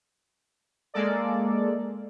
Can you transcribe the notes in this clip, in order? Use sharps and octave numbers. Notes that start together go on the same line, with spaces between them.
G#3 A#3 A4 D5